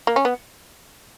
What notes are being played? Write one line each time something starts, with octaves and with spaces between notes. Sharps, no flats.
A#3
C#4
B3